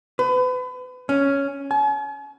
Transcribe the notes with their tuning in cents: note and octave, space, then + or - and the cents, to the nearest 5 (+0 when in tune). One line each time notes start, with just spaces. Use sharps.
B4 +35
C#4 +5
G#5 +45